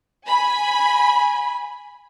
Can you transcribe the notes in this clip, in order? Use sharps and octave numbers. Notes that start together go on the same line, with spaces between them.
G#5 B5